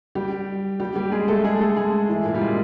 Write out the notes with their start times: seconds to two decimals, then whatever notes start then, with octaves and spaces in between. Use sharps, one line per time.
0.15 G3 G4
0.80 G3 G4
0.96 G3 G4
1.12 G#3 G#4
1.28 A3 A4
1.44 G#3 G#4
1.60 A3 A4
1.77 G#3 G#4
2.09 E3 E4
2.25 A#2 A#3
2.35 G3
2.41 G#3